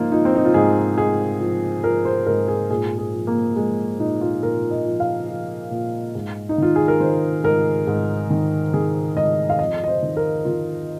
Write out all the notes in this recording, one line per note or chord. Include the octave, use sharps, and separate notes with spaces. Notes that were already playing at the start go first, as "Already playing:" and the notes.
Already playing: G#2 F3 A#3 D#4 F4
F3 D#4
C4
D#4
F4
G#2 G#4
G#2 G#4
F3
F3 A#4
C5
G#2 A#4
G#4
A#2 G#4
G#4
F3
A#3
F3 G#3
A#2 D#4
F4
A#2 A#4
D#5
F3
F5
F3
A#2
G#2
D#4
D#3 F4
G#4
A#4
D#3 C5
G#2 A#4
G#2
D#3
D#3 G#4
G#2 D#5
F5
F2 D#5
D#5
C5
D#3
A#4
D#3 F4